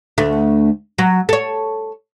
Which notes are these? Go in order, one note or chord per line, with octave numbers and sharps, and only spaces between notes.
D2 A3
F#3
A4 C#5